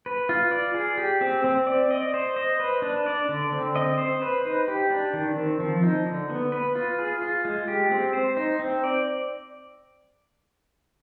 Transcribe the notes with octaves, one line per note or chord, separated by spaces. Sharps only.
B4
F4
D5
G#4
G4
C4
C4
D5
D#5
C5
D#5
B4
D4
D5
D3
C4
D#5
C5
B4
D#4
G4
D4
D#3
C4
F3
D#4
D3
B3
B4
F4
G#4
F4
G#3
G4
C4
C5
D#4
C4
D5